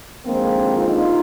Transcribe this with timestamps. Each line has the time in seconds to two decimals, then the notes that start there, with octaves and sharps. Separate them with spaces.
0.24 D#2 D3 F3 G#3 A#3 C4
0.77 D#4 F4